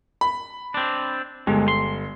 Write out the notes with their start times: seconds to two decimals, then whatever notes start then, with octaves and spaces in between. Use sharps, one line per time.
0.21 B5
0.74 C4 D4
1.47 G1 G#3
1.68 C6